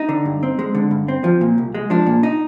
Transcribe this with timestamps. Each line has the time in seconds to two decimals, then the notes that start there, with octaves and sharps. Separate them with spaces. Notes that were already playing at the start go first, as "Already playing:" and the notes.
Already playing: D#4
0.09 D3
0.25 G2
0.43 C4
0.59 G#3
0.75 D3
0.91 G2
1.08 C4
1.24 F3
1.41 A#2
1.58 C2
1.75 G#3
1.90 F3 D4
2.07 A#2
2.23 D#4